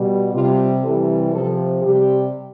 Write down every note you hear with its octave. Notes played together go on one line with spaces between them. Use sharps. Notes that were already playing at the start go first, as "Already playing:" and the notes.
Already playing: B2 G3
C3 G3 F4
C3 E3 G3 A4
C3 F3 A4
C3 G3 G4